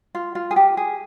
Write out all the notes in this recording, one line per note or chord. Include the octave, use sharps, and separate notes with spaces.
F4
F4
G#4
G4
G#4